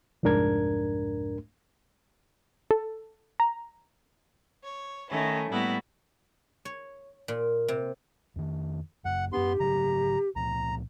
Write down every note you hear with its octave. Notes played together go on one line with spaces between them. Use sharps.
C2 F2 G#2 D4 A#4 G#6
A4
A#5
C#5
D#3 A3 C#4 E4
A2 G3 A#3 B3 E4 F#4
C#5
A#2
C3
F2 D#3
F#1 F#2 F#5
F#2 B3 D4 G4 C6
G#2 C#3 F#3 A#5
C#2 A#2 F3 A#5